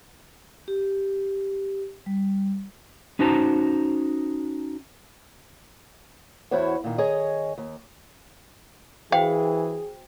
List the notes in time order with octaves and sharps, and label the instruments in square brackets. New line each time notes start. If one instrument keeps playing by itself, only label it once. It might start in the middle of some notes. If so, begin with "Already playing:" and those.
[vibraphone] G4
G3
[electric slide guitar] C#4 D#4 F#4 C5 A5 A#5
[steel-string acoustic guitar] E2 E4 F#4 C5 C#5
A#2 D#3
D#3 G#4 C#5 D#5
D#2
[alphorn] E3 [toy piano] F#4 C5 G5 [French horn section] G#4 [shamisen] F5